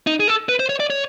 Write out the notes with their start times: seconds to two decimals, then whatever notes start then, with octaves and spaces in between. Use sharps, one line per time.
0.07 D#4
0.20 G#4
0.28 A4
0.49 B4
0.60 C5
0.69 C#5
0.80 D5
0.90 C#5